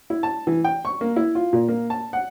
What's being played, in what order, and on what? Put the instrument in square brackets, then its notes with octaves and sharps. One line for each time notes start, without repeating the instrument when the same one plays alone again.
[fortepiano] E4
A5
E3
G5
C#6
A#3
E4
F4
A#2
A#3
A5
F#5